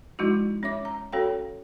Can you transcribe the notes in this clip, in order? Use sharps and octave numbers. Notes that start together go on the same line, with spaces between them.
F3 G#3 D#4 E4 F#4
C#4 C#5 E5 D6
A#5
C#4 F#4 A4 C#5 F5 G5